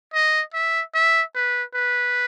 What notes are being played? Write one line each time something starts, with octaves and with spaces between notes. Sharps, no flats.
D#5
E5
E5
B4
B4